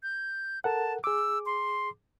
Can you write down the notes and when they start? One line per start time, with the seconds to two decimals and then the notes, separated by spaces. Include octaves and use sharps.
0.03 G6
0.64 A4 A#4 F#5 A5
1.04 G#4 D6 E6
1.46 C6